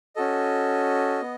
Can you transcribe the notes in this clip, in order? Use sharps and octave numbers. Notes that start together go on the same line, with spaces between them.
C#4 F#4 A4 D#5
B3